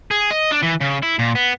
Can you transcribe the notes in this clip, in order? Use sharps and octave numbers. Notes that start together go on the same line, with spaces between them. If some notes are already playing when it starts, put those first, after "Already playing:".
G#4
D#5
D4
E3
C#3
E4
A#2
B3